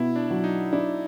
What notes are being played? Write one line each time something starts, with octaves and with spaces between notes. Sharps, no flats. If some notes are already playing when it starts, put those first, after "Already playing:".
Already playing: B2 E4
D4
F#3
D#4
D4 E4